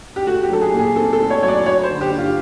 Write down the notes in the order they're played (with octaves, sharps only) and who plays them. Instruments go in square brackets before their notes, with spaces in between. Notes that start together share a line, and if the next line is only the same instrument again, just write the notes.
[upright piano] G4
A3 F#4
G4
F#3 A4
G#4
A#2
G#4
C4 A4
A4
A3
C#5
F#3 C#5
D5
F#3 C#5
C5
D3
G4
G2
F4